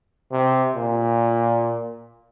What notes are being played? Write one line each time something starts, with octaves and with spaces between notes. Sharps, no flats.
C3
A#2